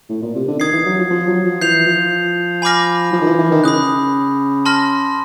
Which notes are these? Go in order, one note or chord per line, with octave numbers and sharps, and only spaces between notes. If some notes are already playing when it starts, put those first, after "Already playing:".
A2
A#2
C3
D3
D#3 D#6 G#6 C7
E3
F#3
F3
F3
F#3
F3
E3 G6 C7 F7
F3
G#5 B5 D6 F6 A#6
F3
D#3
E3
E3
D#3
C#3 B5 D#6 F#6
A5 C6 F6 A#6